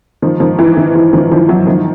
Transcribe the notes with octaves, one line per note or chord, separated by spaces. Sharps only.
D#3 F3
D#3 F3
E3
D#3
E3
D#3 F3
D#3 F3
E3 F#3
D#3 F3